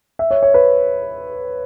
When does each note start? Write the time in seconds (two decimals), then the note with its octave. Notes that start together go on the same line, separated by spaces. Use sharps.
0.19 E5
0.31 C#5
0.43 C#5
0.54 B4